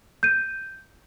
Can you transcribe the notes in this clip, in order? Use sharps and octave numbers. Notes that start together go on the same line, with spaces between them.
G6 D#7